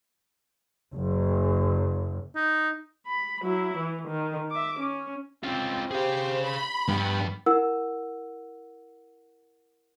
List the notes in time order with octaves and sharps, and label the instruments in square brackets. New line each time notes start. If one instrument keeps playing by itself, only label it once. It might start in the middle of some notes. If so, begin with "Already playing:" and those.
[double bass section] F#1
[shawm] D#4
[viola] B5
F#3 E4
E3
D#3
E5 D6
C#4
[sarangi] C4 [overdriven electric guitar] C#4 F4
[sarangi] G4 [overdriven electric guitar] G#4 F5 [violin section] C5
[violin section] B5 [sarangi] C6
[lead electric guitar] G2 [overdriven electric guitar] F3 G5 [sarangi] B3
[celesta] E4 A#4 F#5 E6